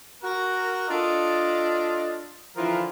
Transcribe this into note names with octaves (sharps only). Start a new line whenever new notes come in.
F#4 A#4
D4 F4 A4 D5 D#5
D3 E3 F3 E4 F4 A#4